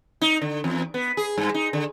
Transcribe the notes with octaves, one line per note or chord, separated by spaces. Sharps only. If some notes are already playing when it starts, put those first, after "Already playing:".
D#4
D3
E2
B3
G#4
G2
D#4
D3